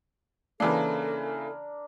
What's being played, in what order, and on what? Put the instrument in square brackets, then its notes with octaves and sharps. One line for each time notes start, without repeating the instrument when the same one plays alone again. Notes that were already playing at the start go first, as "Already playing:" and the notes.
[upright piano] C#3 E3 A#3 [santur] D4 A#4 [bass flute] A4